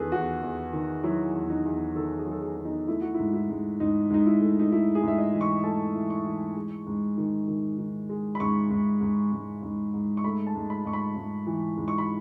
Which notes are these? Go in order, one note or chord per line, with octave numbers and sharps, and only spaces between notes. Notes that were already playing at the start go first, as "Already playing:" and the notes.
Already playing: E2 D#3 G#4 A4 B4
E2 F#4
E2
D#3
F#3 E4
E2
D#4
E2
D#3 A4
G#4
F#3 A4
G#4
E2
D#4
A3 E4
F#4
E4
G#2
E4
G#2
G#2 D#4
G#2 D#4
E4
A3
D#4
A3 E4
G#4
G#2
E5
D#5
E3
C#6
A3 A5
E3
C#6
E3
G#3
G#2
D#3
D#3
D#3
G#3
B5
G#2 C#6
G#2
G#2
G#2
G#2
G#2
C#6
A3 B5
A5
G#2
B5
G#2 C#6
B5
G#2
E3
G#2
C#6
B5